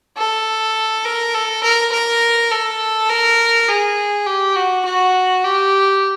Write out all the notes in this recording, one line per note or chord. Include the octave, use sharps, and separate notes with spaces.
A4
A#4
A4
A#4
A#4
A4
A#4
G#4
G4
F#4
F#4
G4